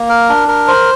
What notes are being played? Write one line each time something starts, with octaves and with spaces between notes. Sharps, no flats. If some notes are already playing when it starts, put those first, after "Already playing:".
Already playing: A#3
A#4
D4
A#4
C5